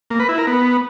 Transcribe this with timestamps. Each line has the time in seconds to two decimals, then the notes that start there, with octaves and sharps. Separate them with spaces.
0.10 A#3
0.20 B4
0.29 E4
0.38 A#4
0.47 B3